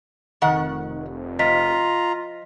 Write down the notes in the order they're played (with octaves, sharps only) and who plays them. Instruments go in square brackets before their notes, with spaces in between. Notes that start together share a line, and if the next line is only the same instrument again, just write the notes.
[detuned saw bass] F1 [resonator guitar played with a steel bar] D#3 F#5
[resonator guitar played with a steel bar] F3 [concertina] F4 A#5 [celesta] D#5 B6